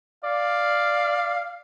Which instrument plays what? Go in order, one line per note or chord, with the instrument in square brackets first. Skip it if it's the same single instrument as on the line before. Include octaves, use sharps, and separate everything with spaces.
[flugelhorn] D5 [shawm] F5